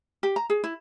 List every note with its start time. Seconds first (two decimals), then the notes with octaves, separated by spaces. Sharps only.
0.23 G4
0.36 A#5
0.50 G#4
0.64 E4